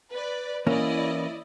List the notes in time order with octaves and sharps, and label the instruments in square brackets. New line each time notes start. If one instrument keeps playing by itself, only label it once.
[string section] B4 D5
[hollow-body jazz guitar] E3 A#3 C#4 [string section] E4 D5 D#5